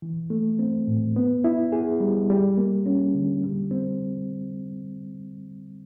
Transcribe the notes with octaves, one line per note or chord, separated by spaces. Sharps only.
E3
A3
C4
A2
B3
E4
G#4
G3
G3
A#3
C#4
D3
G3
C4